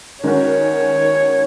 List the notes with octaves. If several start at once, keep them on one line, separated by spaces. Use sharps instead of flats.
D#3 G#3 C#4 F#4 C#5